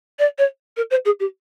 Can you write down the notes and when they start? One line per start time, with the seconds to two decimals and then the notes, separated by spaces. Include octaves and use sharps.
0.19 D5
0.38 C#5
0.77 A#4
0.90 C5
1.05 G#4
1.20 G4